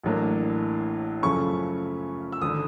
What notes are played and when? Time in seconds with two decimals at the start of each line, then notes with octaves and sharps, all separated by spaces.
0.03 A1 A2 F#3 A#3 D4
1.22 F#2 C#3 F3 A3 C#4 C#6
2.32 E6
2.41 G#1 D3 D#6